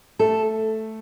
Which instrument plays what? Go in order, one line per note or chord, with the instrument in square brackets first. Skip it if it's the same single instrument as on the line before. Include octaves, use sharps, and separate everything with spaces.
[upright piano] A3 [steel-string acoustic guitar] A4